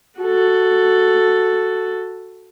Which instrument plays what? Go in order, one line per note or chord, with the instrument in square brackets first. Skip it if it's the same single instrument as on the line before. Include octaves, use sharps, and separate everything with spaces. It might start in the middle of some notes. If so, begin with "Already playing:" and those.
[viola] F#4 A4